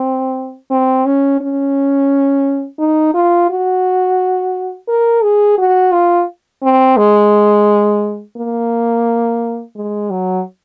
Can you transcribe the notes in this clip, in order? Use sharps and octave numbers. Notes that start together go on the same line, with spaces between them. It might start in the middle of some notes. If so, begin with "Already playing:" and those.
Already playing: C4
C4
C#4
C#4
D#4
F4
F#4
A#4
G#4
F#4
F4
C4
G#3
A#3
G#3
F#3